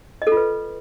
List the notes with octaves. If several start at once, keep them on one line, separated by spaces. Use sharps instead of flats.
D#5
A4
F4
B4